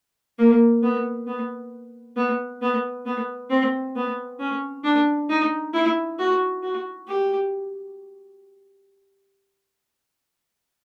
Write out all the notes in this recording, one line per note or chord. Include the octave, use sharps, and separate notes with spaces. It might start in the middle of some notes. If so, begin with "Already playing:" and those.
A#3
B3
B3
B3
B3
B3
C4
B3
C#4
D4
D#4
E4
F#4
F#4
G4